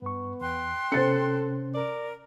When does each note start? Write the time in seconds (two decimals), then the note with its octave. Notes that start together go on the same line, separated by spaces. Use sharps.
0.02 G2 B3 C#6
0.41 E2 G5 C6 F#6
0.92 C3 C#4 A4 C5 A6 C#7
1.74 A#4 D5